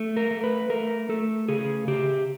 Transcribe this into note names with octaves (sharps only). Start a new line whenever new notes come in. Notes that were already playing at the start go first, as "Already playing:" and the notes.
Already playing: A3
A#4
A3
B4
A3 A#4
A3 A4
C#3 G#4
C#3 G4